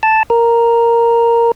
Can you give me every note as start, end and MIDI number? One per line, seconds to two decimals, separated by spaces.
0.03 0.23 81
0.30 1.52 70